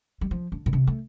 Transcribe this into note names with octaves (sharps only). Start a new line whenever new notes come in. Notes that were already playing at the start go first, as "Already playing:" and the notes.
G3
F3
D3
A#2
C3
A3